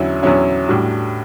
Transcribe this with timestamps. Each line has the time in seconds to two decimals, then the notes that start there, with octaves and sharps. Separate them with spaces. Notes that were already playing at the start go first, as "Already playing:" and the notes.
Already playing: E2 D3 F#3 C#4 E4
0.22 E2 D3 F#3 C#4 E4
0.68 A2 G3 D4 F#4